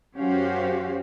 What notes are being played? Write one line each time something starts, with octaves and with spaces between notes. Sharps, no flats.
F#2 C#4 F#4 G4 C5 F5